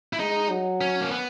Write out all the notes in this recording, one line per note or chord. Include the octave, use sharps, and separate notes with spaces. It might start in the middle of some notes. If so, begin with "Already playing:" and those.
E4
G#3 D#4
F#3
C#4
A#3
B3